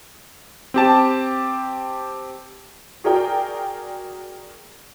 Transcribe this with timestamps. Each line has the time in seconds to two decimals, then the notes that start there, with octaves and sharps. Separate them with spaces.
0.74 C4 G4 A5
3.04 F#4 G#4 A#4 D5 G5